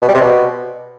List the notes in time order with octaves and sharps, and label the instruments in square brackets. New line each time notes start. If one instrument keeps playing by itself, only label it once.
[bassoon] B2
G3
C3
B2